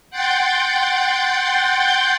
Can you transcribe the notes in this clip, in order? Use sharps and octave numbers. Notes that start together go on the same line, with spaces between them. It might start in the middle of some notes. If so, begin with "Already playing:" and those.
F#5 G5 C6 G6 A6